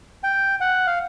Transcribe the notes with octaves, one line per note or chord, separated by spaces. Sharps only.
G5
F#5
F5